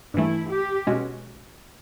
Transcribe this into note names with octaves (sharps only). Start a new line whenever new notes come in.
G2 E3 A3 E4
G4
B2 G#3 C#4 F#4